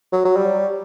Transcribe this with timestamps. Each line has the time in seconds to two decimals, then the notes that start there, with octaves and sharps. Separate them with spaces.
0.13 F#3
0.25 F#3
0.36 G3